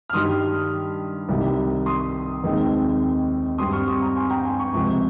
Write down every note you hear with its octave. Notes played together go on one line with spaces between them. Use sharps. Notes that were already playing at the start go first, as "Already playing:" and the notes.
F6
G2 D#3 G3 C6 D#6
C2 C3 D#3 G3
C6 D#6
D#2 D#3 G#3 C4
G2 G3 C4 C6 D#6
C#6 F6
C6 D#6
A#5 C#6
G#5 C6
G5 A#5
G#5 C6
A#5 C#6
C#2 C3 F3 C4